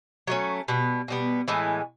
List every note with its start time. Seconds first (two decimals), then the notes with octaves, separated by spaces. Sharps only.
0.27 F#3 A3 C#4
0.68 B2 G3 B3
1.08 B2 G3 B3
1.48 A2 E3 G#3 B3